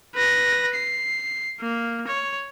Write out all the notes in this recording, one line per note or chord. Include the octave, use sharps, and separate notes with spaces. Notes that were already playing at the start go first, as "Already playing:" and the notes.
B4 A#6
C7
A#3
C#5